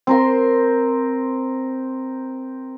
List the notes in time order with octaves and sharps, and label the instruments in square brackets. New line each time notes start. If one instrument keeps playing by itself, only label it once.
[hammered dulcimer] C4 A#4 C6